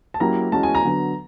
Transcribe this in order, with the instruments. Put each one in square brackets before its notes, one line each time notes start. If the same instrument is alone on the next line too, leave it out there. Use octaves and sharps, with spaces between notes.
[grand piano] A5
[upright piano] F#3 A#3 C#4 E4 G4 [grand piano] A#5
[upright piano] E3 G#3 C#4 F#4 [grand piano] A5
[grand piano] G#5
A#5
[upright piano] D3 F#3 B3